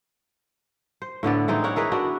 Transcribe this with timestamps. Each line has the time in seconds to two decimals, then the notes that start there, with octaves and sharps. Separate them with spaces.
1.02 C5
1.23 A2 D3 B3 D5
1.48 E3 G#3 C4 D#4
1.64 A#4 C#5 F#5
1.76 E4 G#4 A#4 B4
1.92 B3 D4 F#4